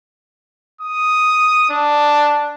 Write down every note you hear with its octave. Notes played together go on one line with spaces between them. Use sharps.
D#6
D4